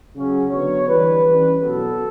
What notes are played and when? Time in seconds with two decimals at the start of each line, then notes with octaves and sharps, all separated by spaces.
0.13 C#3 F#3 C#4
0.51 D3 F#3 B3 D4 C#5
0.87 E3 G3 D4 B4
1.26 E3 G3 C#4
1.62 B2 F#3 B3 A4